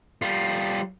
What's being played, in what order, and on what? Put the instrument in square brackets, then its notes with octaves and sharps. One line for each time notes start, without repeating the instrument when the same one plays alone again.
[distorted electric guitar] G3 F4